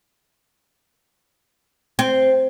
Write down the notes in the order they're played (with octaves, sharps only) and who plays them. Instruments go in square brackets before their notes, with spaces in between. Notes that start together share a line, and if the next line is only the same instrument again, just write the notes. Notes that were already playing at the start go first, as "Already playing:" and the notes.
[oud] C4